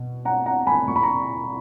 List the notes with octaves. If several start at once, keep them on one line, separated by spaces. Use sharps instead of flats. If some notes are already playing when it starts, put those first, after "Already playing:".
Already playing: B2
F#5 A#5
F#5 A#5
G#5 B5
A#2 C#6
B5
A#5 C#6